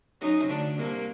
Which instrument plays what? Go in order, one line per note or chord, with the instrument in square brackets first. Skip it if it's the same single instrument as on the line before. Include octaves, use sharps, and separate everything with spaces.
[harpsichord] F#2 F#3 [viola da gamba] D#4
[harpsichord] C3
[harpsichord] D2 D3 [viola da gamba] D4
[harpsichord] C2 C3 [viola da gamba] A#3